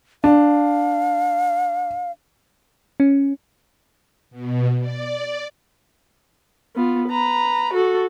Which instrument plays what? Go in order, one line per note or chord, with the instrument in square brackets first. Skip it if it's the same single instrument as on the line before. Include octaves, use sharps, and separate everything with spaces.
[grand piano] D4 [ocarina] F5
[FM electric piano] C#4
[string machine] B2
D5
[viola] B3 F4
B4 A#5
F#4 A4